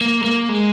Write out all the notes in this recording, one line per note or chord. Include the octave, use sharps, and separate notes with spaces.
A#3
G#3
A#3
G#3